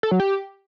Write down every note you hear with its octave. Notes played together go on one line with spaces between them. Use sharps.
A4
F#3
G4